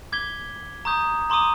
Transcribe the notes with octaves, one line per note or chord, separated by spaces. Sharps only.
D6 G#6 B6 G7
A#5 C#6 D#6 G6
A#5 C6 D6 D#6 D#7